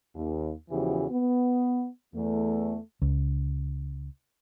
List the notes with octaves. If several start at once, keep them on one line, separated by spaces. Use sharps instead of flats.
D#2
E2 C#3 E3 F3 F#4 G4
B3
E2 A3
C#2